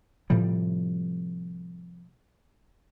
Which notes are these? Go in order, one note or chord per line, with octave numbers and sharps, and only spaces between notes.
A2 C3 F3 G3